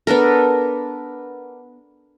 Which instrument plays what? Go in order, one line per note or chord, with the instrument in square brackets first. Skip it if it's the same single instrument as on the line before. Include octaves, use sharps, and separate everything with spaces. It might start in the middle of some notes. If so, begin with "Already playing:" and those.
[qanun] B3 D4 A4 A#4